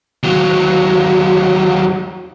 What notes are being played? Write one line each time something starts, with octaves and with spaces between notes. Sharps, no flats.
D#2 F#3